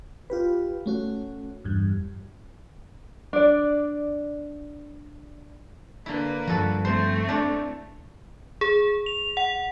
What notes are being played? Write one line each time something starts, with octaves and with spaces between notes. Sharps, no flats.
F4 G4 B4
A3 C#4 F#4
E2 G2
D4 D5
D3 A#3 E4 B4
G2 F3 F#4 A4
A3 C4 C5
D4 E4 C#5
G#4
F7
F#5